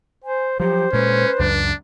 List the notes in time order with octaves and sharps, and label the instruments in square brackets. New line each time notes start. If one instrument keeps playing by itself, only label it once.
[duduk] C5 [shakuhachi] G#5
[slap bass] F3 F#3 [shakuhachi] G4 [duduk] C5
[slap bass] A#2 G#3 [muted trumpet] C#4 [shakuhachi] B4
[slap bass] C#2 F#2 [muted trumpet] D4